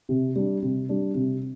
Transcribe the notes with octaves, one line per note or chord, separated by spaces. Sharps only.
C3
G3 D4
C3
G3 D4
C3